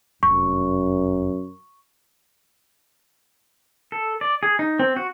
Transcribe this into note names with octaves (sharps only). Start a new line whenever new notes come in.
F1 F#2 C#6
A4
D5
G#4
D#4
C4
F#4